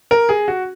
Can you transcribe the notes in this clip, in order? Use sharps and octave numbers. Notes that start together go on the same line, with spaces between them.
A#4
G#4
F#4